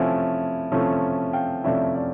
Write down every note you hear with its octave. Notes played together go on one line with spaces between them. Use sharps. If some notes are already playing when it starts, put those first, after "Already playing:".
Already playing: C3 F3 A3 C#4 E4 F#5 G#5
C3 F3 A3 C#4 E4
F5 G5
C3 F3 A3 C#4 E4 D5 E5
D5 E5